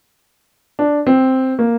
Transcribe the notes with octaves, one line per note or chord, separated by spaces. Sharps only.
D4
C4
A#3